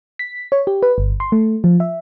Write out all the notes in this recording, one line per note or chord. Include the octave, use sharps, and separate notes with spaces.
B6
C#5
G4
B4
G1
C6
A3
F3
E5